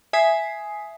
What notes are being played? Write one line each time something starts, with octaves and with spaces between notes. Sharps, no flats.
E5 G#5 D#6 G#6 B6 C7